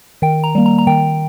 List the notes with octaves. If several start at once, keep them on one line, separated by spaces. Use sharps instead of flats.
D#3 G5
A#5
G3 A#3
A#5
A#5
D#3 G5